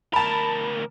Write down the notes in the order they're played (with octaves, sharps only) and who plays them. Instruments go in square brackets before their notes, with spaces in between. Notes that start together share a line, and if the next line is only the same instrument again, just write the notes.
[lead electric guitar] D2 A#4 [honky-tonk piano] A5 B5